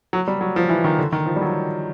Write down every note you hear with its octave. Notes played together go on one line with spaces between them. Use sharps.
F#3
G3
F#3
F3
E3
D#3
D3
D#3
F3
G3
F#3